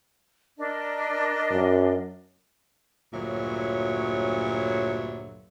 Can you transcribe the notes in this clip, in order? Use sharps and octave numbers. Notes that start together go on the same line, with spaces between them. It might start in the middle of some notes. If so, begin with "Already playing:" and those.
D4 A#4 D#5
F#2
D2 G2 A#2 F#3 C#5 E5